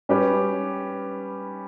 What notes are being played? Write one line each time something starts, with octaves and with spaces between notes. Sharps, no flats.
G3 C#4 G4 B4